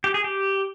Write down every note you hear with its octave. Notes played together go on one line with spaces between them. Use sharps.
G4
G#4
G4